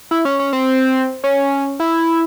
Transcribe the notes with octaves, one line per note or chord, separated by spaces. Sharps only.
E4
C#4
C#4
C4
C#4
E4